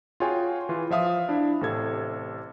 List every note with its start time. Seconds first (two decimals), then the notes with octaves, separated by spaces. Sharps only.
0.20 F4 F#4 G#4 C#5 G5 G#5
0.69 E3 F4
0.90 F3 E5 F5 D#6
1.29 D4 E4
1.61 A1 C3 A4 G#6